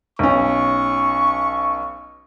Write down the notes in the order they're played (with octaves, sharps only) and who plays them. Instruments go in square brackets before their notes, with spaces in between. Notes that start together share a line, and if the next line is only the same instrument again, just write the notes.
[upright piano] B1 C#4 [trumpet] C#6